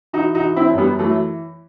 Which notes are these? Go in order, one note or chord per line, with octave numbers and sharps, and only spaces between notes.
E3 D#4 F#4
D#4 F#4
E3
C4 E4
F#2
G3 B3
E3 F#3 A3